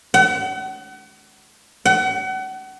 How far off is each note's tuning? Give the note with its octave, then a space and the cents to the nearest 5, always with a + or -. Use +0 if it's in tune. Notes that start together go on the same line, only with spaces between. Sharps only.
F#5 +40
F#5 +35